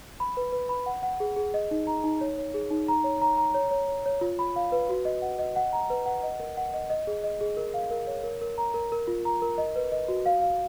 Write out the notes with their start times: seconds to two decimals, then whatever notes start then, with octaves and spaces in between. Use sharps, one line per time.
0.20 B5
0.37 B4
0.52 B4
0.69 B5
0.86 F#5
1.03 F#5
1.20 G#4
1.36 G#4
1.54 D#5
1.71 D#4
1.87 A#5
2.04 D#4
2.21 C#5
2.38 C#5
2.54 G#4
2.70 D#4
2.88 A#5
3.04 C#5
3.22 A#5
3.37 A#5
3.54 C#5
3.71 C#5
3.89 C#5
4.06 C#5
4.21 F4
4.39 B5
4.56 F5
4.72 B4
4.89 F#4
5.05 D#5
5.22 F#5
5.39 D#5
5.56 F#5
5.73 A#5
5.90 B4
6.06 F#5
6.23 D#5
6.40 A#4
6.57 F#5
6.74 D#5
6.90 D#5
7.07 G#4
7.24 D#5
7.41 G#4
7.57 A#4
7.74 F5
7.91 A#4
8.07 C#5
8.24 A#4
8.41 A#4
8.58 A#5
8.74 A#4
8.92 A#4
9.07 F4
9.25 A#5
9.42 A#4
9.58 D#5
9.76 B4
9.92 D#5
10.08 F#4
10.26 F5
10.42 F5